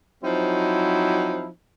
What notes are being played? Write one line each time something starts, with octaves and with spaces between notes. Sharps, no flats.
F3 F#3 C4 D#4 E4